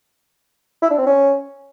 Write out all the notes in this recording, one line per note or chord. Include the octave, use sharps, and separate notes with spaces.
E4
D4
C4
C#4